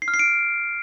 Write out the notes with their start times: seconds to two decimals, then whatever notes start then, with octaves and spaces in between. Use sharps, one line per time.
0.02 C7
0.08 F6
0.14 C7
0.19 D7